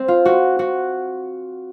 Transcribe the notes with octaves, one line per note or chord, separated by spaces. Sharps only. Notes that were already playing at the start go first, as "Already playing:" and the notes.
Already playing: C4
F4
F#4
F#4